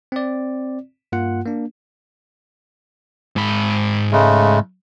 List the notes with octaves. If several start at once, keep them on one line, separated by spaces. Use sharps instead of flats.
C4 D5
G2 A#3 F4 F#5
A#3 D4
G#2 B5
C#3 G#3 A3